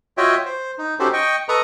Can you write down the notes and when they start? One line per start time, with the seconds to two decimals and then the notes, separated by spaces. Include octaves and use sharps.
0.17 F4 F#4 C#5 D#5 E5 G5
0.46 C5
0.78 D#4
0.99 C#4 D#4 F#4 G4 A4 C5
1.13 D#5 G5 C#6
1.49 A4 B4 D#5 A#5 C#6 D#6